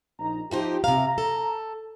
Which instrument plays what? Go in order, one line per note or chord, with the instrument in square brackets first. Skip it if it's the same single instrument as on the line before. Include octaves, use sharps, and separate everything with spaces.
[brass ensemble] A#1 D#4 A#5
[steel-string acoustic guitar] F3 D#4 C5 [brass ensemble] F4 G4
[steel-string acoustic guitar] C3 F5 [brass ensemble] A#5
[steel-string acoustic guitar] A4